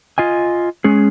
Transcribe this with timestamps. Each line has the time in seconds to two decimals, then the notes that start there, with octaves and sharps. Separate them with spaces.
0.18 F4 D#5 G#5
0.84 G#3 C#4 G#4